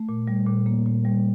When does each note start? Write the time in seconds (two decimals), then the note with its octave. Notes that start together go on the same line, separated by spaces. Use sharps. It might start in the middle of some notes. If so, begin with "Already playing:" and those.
Already playing: A3
0.09 A#2
0.28 G3
0.47 A#2
0.66 A#3
0.86 A#2
1.05 G3